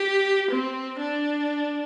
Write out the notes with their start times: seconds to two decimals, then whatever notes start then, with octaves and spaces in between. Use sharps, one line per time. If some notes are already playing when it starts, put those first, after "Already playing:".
Already playing: G4
0.51 C4
0.99 D4